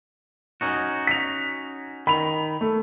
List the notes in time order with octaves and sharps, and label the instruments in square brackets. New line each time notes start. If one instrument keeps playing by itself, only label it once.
[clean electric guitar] C#4 D#4 F#4
[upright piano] B6 F7
[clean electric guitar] D#3 [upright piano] B5 F7
[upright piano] A3